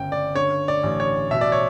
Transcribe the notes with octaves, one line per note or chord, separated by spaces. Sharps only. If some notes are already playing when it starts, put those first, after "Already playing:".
Already playing: G1 C#3 G5
D5
D3 C#5
D5
A1
C#5
B2 E5
D5
C#5